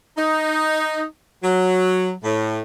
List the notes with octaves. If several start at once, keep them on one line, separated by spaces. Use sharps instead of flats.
D#4
F#3
A2